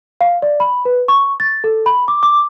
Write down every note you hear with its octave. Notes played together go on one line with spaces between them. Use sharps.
F5
D5
B5
B4
C#6
A6
A4
B5
D6
D6